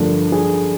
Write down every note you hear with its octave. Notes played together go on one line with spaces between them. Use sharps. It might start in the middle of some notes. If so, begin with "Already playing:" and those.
Already playing: G2 D3 F3 A3 A#4
G#4